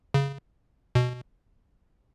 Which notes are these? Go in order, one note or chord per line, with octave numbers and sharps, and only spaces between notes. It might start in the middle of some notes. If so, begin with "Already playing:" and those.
C#3
B2